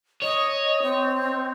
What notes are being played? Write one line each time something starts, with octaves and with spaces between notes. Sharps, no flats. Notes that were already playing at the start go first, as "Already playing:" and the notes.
C#5 D#5
C4